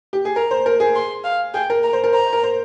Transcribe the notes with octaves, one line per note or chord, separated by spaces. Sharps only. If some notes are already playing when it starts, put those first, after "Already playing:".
G4
G#4
A#4 A#5
C5
A#4
G#4
C6
F5
G#4 G5
A#4
A#5
C5
A#4
C5 A#5
A#4
C5